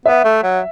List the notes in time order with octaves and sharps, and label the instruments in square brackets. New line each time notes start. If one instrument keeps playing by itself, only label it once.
[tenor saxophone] B3 [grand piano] E5
[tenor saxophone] A3
F#3